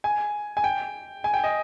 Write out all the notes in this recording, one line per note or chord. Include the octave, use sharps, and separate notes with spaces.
G#5
G#5
G5
G#5
G5
D#5